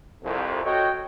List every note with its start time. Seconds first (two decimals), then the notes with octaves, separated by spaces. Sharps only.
0.24 C2 F2
0.64 F#4 A4 C#5 D#5 G5